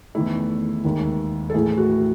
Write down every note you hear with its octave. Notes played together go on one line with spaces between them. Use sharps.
E2 D#3 A3 E4
D#2 D#3 G#3
A4
A2 E3 A3 G#4
F#4